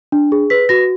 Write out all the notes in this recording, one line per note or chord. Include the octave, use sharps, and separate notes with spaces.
D4
G#4
B4 B6
F#4 A#6